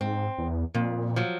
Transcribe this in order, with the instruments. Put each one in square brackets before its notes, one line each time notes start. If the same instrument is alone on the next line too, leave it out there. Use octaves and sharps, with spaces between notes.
[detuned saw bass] G#2 [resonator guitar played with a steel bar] C4
[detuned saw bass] E2
[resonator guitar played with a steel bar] F2 [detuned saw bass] A#2
[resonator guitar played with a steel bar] F3 F#3